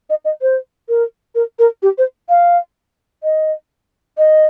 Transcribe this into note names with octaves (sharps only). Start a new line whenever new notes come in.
D#5
D#5
C5
A#4
A#4
A#4
G4
C5
F5
D#5
D#5